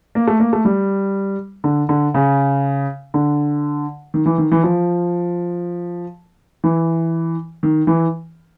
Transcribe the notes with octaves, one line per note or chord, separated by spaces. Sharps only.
A#3
A3
A#3
A3
G3
D3
D3
C#3
D3
D#3
E3
D#3
E3
F3
E3
D#3
E3